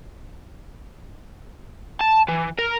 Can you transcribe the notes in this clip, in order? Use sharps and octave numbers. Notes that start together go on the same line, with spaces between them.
A5
E3
A#4